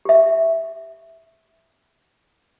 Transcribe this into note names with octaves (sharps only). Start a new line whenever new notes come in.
G4 E5